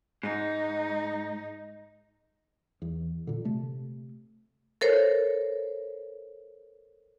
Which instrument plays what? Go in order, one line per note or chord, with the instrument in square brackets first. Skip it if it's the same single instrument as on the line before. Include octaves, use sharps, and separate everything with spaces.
[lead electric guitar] G#2 [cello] D#4
[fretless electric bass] E2
A#2 D3
C3 A3
[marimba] A4 A#4 C5 C#5